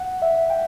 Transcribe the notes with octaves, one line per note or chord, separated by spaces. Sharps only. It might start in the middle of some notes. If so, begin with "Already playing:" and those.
Already playing: F#5
E5
G5